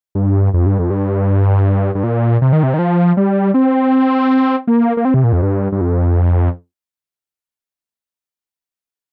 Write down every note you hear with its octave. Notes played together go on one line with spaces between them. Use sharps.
G2
F2
G2
F2
G2
G2
A#2
C3
D#3
C3
D#3
F3
G3
C4
A#3
A#3
C4
C3
A#2
F2
G2
G2
F2